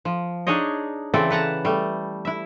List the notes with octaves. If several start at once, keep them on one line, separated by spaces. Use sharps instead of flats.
F3
D4 D#4 G#4 C#5 D#5
C#3 E3 C4 A4 D5 E5
B4 F#5 A5 A#5
G3 A3
E4 E5